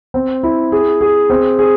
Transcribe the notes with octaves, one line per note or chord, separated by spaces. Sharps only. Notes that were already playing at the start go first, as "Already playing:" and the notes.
C4
E4
G#4
G#4
C4
G#4